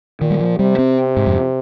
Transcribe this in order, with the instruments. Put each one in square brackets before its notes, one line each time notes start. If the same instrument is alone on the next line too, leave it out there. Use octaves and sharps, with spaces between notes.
[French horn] A#2 [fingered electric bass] D#3
[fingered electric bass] G3
F3
[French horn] C3 [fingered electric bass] G3
[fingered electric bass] C4
G#2
F2